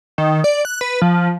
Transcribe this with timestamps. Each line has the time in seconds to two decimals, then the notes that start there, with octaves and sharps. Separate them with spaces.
0.18 D#3
0.44 D5
0.65 F#6
0.81 B4
1.02 F3